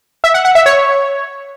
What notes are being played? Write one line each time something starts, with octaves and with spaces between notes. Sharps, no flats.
E5
F#5
F#5
E5
C#5